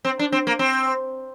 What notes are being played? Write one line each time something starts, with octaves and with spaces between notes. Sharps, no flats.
C4
D4
C4
A#3
C4